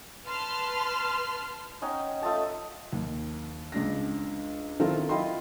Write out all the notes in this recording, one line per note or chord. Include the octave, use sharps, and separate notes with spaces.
B4 A5 C6 F6
C#4 D#4 F#5 G5
A3 F4 D#5 A5
D#2
C#2 D4 A#6
D#3 C4 E4 F4 A4 A#4
E4 F4 D#5 G5 B5 C6